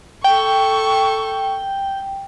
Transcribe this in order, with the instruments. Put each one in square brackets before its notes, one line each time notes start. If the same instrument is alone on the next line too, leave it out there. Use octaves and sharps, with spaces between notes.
[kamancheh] A4 C#6 [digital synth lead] G5